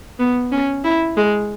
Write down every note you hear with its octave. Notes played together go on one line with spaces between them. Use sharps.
B3
C#4
E4
G#3